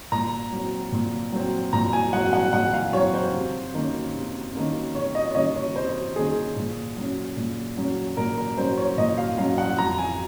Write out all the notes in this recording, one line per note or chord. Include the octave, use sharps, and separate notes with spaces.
A#2 A#5
F#3 C4
A#2
F#3 C4
A#2 A#5
G#5
F#3 C4 F#5
F#5
A#2 F#5
F5
F#3 C4 C#5
C5
C3
D#3 A#3 C#4
C3
D#3 A#3 C#4
C3 C#5
D#5
C#5
D#3 A#3 C#4 D#5
C#5
C3 C5
D#3 A#3 C#4 G#4
A#2
F#3 C#4
A#2
F#3 C#4
A#2 A#4
A#4
F#3 C#4 C5
C#5
A#2 D#5
F5
F#3 C#4 F5
F#5
F2 A#5
G#5